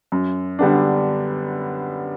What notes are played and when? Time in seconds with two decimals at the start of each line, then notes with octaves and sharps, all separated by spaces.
0.12 F#2
0.59 D3 G3 B3 D4